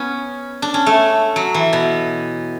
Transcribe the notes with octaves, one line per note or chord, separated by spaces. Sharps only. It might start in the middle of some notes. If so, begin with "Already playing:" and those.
Already playing: B3 C#4
D4
C#4
A3
F#3
E3
B2